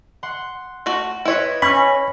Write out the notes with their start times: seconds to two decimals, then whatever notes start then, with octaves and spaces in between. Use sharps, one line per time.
0.23 F#5 C6
0.86 A3 F#4
1.25 E4 B4 C#5 D#5 G5
1.62 C#4 B5 C#6 A#6